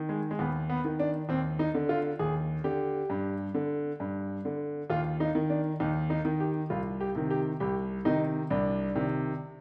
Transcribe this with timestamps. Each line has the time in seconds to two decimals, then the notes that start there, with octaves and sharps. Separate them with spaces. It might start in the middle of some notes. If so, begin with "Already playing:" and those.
Already playing: D#3
0.09 G#3
0.31 G#3
0.39 D#2 B3
0.70 B3
0.85 D#3
1.00 D4
1.29 D#2 C4
1.59 D#4
1.74 D3
1.89 F4
2.19 D#2 G#4
2.64 D3 G4
3.10 G2
3.54 D3
4.00 G2
4.45 D3
4.90 D#2 F4
5.20 D#4
5.35 D#3
5.50 D4
5.80 D#2 D#4
6.10 D#4
6.25 D#3
6.40 G4
6.70 C2 F4
7.01 G4
7.15 C3 D#3
7.30 G4
7.60 C2 G4
8.05 C3 D#3 D#4
8.50 C2 D4
8.95 C3 D#3